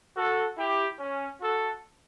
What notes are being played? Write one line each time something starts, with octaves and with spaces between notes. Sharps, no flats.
F#4 A4
E4 G4
C#4
F#4 A4